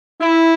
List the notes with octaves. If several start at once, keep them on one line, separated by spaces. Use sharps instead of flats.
E4